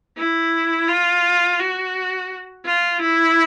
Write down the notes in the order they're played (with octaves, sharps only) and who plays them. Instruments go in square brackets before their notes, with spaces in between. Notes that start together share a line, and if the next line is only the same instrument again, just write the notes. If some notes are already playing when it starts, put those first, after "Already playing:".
[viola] E4
F4
F#4
F4
E4